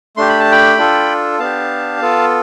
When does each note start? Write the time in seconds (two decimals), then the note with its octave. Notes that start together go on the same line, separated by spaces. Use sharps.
0.17 A3 D4 G4 C6
0.28 B5
0.40 A5
0.51 G5 B5
0.78 D4 F4 A4
1.39 B3 D4 G4 F5 A5
2.01 B3 F4 A4